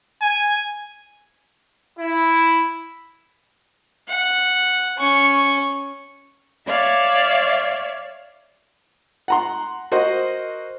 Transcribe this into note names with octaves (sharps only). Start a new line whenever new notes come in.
G#5
E4
F#5
C#4 C#6
C#5 D5 E5 F5
F#5 A#5 C6
F#4 A#4 C5 D#5